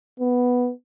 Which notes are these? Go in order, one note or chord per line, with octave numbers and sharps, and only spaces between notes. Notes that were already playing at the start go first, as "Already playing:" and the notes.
B3